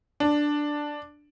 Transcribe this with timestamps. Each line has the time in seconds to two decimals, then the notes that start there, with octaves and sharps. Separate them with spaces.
0.20 D4